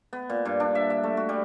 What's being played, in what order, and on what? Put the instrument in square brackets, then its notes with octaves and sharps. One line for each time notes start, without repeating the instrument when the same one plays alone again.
[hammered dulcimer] B3
A#2
G2
D4
E5
E5
A3
F#4
G3